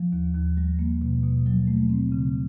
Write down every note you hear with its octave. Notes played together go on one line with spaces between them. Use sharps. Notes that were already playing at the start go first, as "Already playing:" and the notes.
Already playing: F3
D#2
D#2
G3
A#3
B2
B2
F#3
A3
C4
C#3